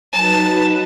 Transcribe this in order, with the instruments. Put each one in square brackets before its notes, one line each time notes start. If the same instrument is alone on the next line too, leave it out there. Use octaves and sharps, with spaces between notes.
[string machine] F#3 D#4 B4 [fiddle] A5